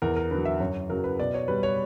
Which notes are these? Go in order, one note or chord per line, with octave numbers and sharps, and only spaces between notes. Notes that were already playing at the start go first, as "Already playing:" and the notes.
E2 A#4
A#4
D3 F#3 B4
E5
F#2 C#5
C#3 F#3 A#4
B4
B2 D5
C#5
G3 B4
C#5